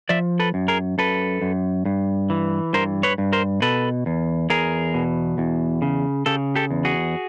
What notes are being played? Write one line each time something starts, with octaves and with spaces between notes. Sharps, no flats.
F3 D5 E5
A4 B4
F#2
G#4 A#4
F#2 A4 B4
F#2
G2
E3
G2 A#4 C5
B4 C#5
G2
A#4 C5
B2 A4 B4
E2
E2 G#4 A#4
B2
E2
C#3
C#3 G4 A4
G4 A4
E2
F#4 G#4